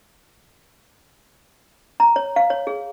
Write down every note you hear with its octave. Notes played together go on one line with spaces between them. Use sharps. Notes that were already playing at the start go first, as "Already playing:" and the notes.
A#5
C#5
F5
C#5
G#4